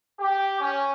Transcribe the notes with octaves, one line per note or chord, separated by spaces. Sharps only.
G4
C#4